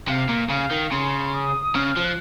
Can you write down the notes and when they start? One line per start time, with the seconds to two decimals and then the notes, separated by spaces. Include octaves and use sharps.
0.08 C3 F5
0.29 A#2
0.49 C#3 F5
0.71 D#3
0.91 C#3 C6
1.34 D#6
1.75 C#3 F6
1.97 F3
2.04 F#6